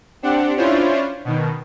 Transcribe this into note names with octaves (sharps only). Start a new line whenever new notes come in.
C4 D4 G4 F#5
C#4 D4 E4 F4 C5 C#5
B2 D#3